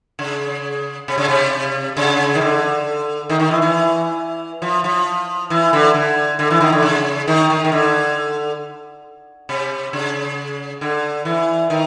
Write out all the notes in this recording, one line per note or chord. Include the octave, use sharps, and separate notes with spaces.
C#3
C3
C#3
C3
C#3
D#3
D3
D#3
D#3
E3
E3
F3
F3
E3
D3
D3
D3
E3
D#3
D3
C#3
D#3
D#3
D#3
D3
C3
C#3
D3
E3
D#3